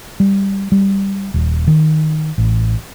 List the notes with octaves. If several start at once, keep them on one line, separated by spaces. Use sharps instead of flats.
G3
G3
D#1
D#3
A1